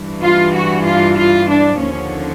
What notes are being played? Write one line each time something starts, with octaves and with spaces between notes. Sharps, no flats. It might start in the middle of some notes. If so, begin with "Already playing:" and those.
Already playing: G2 E3
F4
F#4
F4
F4
D4
D#2 D3 F3 C#4